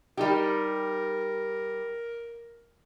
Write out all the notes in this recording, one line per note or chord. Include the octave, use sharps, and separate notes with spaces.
G3 D#4 G4 A#4